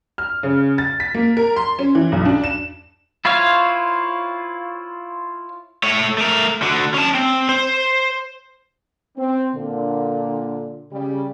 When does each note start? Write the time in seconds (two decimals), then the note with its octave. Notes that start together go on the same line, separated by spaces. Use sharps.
0.18 F6
0.43 C#3
0.78 A6
1.00 B6
1.14 A#3
1.37 A#4
1.56 C6
1.79 C#4
1.95 E3
2.12 B1
2.25 D4
2.44 E7
3.25 E4 F4 C5 C#5 F5
5.83 A3 C#5
6.18 A3 A#4
6.62 D3 F#4
6.94 C#4 A5
7.15 C4
7.49 C5
9.16 C4
9.53 A#2 D3
10.91 C#3 G3